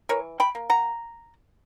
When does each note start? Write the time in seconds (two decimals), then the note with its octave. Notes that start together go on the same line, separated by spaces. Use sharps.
0.09 E3 A#4 C#5
0.40 G5 B5
0.55 A#3
0.70 F#5 A#5